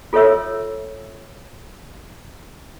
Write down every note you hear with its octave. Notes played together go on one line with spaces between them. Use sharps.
F4 A4 B4 C#5 E5 E6